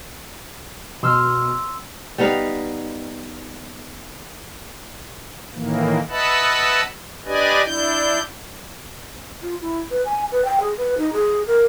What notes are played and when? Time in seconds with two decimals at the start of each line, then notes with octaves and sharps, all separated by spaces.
1.03 B2 C6 E6 F6
2.18 G3 B3 D#4 F5
5.53 A2 D#3 E3 A#3
6.09 B4 D#5 E5 F#5 A5 B5
7.25 D4 G4 B4 D5 D#5 G#5
7.64 D4 E4 G6
9.42 F4
9.61 E4
9.91 B4
10.05 G#5
10.32 B4
10.45 G5
10.60 G#4
10.77 B4
10.98 D#4
11.13 G#4
11.47 A#4